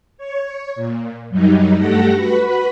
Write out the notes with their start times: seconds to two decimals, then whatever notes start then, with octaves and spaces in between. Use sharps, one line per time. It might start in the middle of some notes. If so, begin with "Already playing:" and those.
0.18 C#5
0.75 A#2
1.29 F#2 F#3 G3 D#4
1.77 G2 A3 G4 A4 F#5 A#6
2.15 F#4 B4 B5